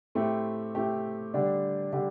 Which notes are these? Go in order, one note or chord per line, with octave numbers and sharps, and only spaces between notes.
A2 A3 C4 G4
A2 A3 C4 G4
D3 G3 D4 G4
D3 G3 D4 G4